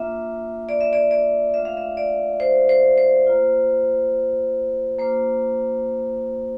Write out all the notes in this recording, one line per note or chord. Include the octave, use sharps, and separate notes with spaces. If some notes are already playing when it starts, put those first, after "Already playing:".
Already playing: A#3 D4 F4 E5
D5
E5
D5
D5
A3 D4 F4 E5
F5
E5
D5
C5
C5
C5
A#3 F4
A#3 D4 F4 C5